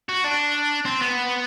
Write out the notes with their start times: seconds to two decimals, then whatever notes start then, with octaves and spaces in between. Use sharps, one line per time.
0.09 F#4
0.24 D4
0.85 C4
1.01 B3